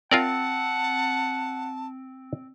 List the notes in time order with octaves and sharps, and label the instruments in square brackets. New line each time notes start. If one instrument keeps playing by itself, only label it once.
[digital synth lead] C4 [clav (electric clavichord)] F4 A#4 D5 [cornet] F#5 [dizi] A5